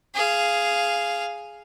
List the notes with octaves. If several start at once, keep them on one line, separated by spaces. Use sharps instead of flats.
G#4 F5